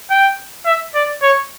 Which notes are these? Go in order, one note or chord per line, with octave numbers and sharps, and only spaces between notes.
G5
E5
D5
C#5